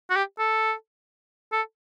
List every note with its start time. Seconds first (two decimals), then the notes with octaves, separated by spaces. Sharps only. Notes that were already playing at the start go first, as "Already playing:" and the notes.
0.10 F#4
0.16 G4
0.39 A4
1.52 A4